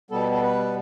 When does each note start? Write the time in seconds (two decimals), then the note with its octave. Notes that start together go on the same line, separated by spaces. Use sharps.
0.11 B2 G3 B3 A4
0.31 A4
0.42 B4